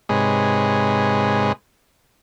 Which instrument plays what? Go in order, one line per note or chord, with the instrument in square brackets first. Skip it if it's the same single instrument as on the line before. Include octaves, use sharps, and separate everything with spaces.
[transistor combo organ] G#2 C3 G#3 G#4 B4 C#5